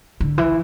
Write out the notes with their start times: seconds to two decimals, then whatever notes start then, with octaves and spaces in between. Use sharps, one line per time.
0.21 D3
0.38 E3